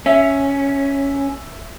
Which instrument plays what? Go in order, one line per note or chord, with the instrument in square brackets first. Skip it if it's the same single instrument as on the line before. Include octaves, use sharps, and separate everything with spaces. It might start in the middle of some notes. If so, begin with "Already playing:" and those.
[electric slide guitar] C#4 [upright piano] E5